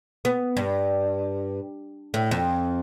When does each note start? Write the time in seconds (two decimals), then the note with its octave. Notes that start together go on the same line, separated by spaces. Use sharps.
0.25 B3
0.57 G2
2.14 A2
2.31 F2